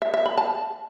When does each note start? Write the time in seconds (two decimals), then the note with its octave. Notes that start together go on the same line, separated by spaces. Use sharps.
0.02 E5
0.14 E5
0.26 B5
0.37 A5